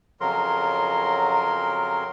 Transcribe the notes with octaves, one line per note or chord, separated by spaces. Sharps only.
F2 C#3 F#3 A#4 C6